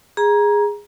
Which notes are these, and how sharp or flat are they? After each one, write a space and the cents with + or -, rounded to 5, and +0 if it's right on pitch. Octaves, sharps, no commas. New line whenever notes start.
G#4 -10 A#5 +20